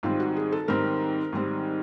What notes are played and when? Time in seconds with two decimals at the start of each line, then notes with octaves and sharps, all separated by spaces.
0.03 G#2 D#3 G3 C4 F4
0.20 F#4
0.36 G#4
0.52 A4
0.68 G#2 D#3 G3 C4 A#4
1.32 G#2 D#3 G3 C4